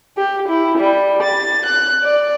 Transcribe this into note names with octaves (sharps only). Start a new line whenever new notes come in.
G4
E4
G3
A6
F#6
D5